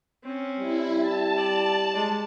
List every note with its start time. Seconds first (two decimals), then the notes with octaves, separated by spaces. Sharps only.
0.23 C4 C#4
0.60 G3 E4
0.99 A5
1.37 D5
1.94 G#3 D5